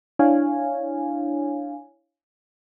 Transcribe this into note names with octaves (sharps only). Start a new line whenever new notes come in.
D4 E4 C#5 F5 G#5